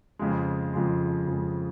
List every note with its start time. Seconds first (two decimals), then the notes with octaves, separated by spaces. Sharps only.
0.19 F2 C#3 F3 G#3
0.73 F2 C#3 F3 G#3
1.27 F2 C#3 F3 G#3